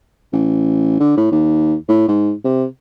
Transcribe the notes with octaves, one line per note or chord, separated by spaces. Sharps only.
A1
D3
A2
D#2
A2
G#2
C3